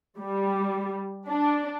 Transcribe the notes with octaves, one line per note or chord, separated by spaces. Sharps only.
G3
D4